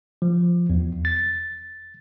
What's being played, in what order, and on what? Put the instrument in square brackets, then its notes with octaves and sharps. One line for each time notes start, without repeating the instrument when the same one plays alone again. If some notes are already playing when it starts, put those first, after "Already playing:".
[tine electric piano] F3
E2
A6